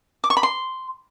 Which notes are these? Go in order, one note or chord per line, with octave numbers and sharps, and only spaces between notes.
D6
C#6
B5
C6